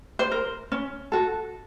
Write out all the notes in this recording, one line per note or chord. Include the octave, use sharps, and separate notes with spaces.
C5
A#4
C#4
F#4 A4